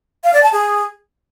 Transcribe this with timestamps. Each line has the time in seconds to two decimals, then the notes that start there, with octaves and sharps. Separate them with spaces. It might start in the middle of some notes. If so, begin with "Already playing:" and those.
0.24 F5
0.33 D5
0.43 A5
0.52 G#4